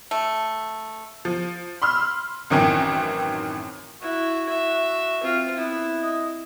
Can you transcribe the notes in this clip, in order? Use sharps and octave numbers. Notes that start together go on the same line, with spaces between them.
A3
F3
B5 C6 E6 F6
A1 F#2 D#3 E3 C4 G#5
E4 F#4
E5
C4 F4
B3 E4
D#5